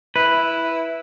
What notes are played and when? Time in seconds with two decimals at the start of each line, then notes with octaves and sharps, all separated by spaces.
0.16 E4 B4